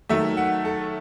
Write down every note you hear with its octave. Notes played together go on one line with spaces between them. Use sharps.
D#3 F#3 A3 E5
F#5
A4